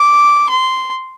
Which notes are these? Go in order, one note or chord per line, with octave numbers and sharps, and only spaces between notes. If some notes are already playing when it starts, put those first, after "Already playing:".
Already playing: D6
C6